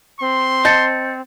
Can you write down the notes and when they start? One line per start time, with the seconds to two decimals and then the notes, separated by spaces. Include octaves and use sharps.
0.21 C4 C6
0.65 D#5 A5 G6 A6 C#7